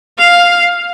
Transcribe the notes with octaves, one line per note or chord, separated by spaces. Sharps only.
F5